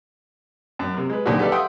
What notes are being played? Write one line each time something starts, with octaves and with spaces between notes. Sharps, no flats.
F#2
C3 A#4
G#3 B4
A#2 D3 D#3 F3 F#3 F#4
G4 A4 B4 D5 E5 F5
E5 F#5 G5 C6 D#6